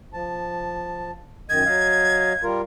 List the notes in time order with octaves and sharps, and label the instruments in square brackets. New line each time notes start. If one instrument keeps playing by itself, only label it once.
[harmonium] F3 A5
[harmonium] F#2 D#3 D#5 [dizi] G#6
[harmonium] F#3 D#5 F5
G3 F4 A#4